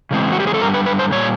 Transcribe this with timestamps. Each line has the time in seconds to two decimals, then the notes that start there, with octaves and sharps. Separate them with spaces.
0.11 C#3 E3 G#3 C4
0.32 F#4
0.40 G4
0.47 G#4
0.54 A4
0.61 G2 D3 G3 A#4
0.74 B4
0.86 B4
0.99 C5
1.11 A#2 G3 C#5